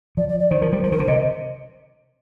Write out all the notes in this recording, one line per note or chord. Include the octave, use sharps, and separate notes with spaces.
F3 D5
D5
D5
D#3 C5
F3 A#4
G3 C5
F3 C5
D#3 A#4
D3 C5
C3 D#5